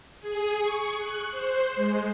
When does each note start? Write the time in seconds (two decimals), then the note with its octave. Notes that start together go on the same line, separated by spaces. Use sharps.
0.21 G#4
0.58 C#6
0.99 F#6
1.31 C5
1.75 G#3